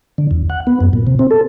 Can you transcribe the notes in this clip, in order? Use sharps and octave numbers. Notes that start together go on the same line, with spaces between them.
D3
E2
F#5
B3
F#2
A#2
C3
C4
A4